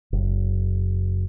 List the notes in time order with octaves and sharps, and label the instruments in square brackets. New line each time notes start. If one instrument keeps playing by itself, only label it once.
[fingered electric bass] F#1